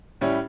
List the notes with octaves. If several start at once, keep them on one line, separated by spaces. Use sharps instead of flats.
A2 G3 C#4 E4